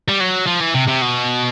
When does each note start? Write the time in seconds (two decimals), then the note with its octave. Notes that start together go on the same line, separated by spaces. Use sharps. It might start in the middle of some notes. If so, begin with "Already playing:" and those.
0.09 G3
0.21 F#3
0.47 F3
0.61 E3
0.74 C3
0.88 C3
1.02 B2